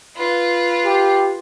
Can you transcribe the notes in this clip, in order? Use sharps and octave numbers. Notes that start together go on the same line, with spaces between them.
F4 B4
G4